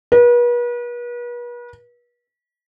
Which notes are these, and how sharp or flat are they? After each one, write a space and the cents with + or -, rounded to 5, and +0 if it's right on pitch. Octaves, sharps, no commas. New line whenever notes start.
B4 -40